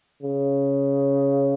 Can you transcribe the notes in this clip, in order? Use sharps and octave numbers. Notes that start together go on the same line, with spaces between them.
C#3